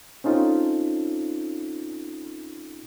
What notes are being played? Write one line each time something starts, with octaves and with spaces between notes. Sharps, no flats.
C4 C#4 D#4 F4 A4